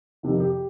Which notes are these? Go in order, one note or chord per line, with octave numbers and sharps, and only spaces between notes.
F2 C3 D#3
G4